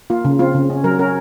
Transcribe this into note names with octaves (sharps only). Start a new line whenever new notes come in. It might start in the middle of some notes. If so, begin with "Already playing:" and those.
A#3 F4
C#3
C4 F4
C#3
C#4
F#3 A#4
C#4 A#4